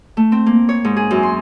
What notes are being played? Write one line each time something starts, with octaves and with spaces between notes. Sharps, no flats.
A3
C4
A#3
C#5
G#2
G#4
F#2
C6